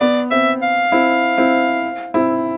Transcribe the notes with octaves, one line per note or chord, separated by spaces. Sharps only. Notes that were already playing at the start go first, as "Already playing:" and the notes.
B3 D5
C4 E5
F5
C4 E4
C4 E4
C4 E4